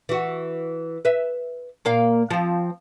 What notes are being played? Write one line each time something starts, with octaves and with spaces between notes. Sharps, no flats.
E3 F#4
B4 E5
A#2 A#3 F5
F3 C4